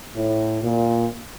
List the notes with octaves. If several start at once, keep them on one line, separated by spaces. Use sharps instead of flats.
A2
A#2